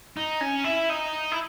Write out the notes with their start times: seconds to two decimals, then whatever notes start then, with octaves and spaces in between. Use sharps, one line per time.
0.17 D#4
0.41 C#4
0.64 E4
0.90 D#4
1.32 E4